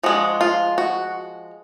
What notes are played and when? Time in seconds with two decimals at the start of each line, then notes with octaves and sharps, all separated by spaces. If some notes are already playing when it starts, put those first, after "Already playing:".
0.03 F3 G#3 D4 F#4
0.41 F4
0.78 F#4